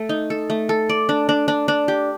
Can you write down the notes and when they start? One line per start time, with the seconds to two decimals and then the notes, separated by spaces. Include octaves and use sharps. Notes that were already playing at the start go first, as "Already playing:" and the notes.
Already playing: A3 A4
0.09 D#4
0.30 A4
0.50 A3
0.69 A4
0.89 D5
1.09 D4
1.29 D4
1.48 D4
1.68 D4
1.88 G4